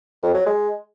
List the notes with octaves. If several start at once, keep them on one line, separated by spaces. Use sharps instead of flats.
F2
F#3
G#3